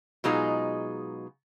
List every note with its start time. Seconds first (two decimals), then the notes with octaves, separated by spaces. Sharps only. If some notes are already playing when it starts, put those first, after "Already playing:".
0.24 B2 F#3 G#3 D#4 F4 G#4